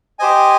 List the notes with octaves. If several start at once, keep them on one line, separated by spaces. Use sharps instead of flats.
G4 C5 D#5 G#5